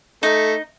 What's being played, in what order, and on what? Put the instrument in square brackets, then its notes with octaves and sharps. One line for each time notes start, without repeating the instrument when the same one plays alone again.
[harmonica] A3 [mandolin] D#4